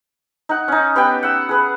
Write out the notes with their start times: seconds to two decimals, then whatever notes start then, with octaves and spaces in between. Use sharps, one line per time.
0.49 D#4 F#5
0.68 C#4 D#4
0.96 B3 G4 G5
1.23 F#5 E6
1.49 G#4 B4